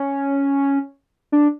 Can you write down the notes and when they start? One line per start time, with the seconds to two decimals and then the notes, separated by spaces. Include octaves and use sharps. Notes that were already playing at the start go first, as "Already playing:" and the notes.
Already playing: C#4
1.32 D4